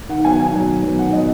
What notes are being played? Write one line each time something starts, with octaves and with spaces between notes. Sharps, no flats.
D#3 F#5
F#3 B3 G#5
D#3 G#5
F#3 B3
D#3
F#3 B3
D#3 F#5
F#3 B3 D#5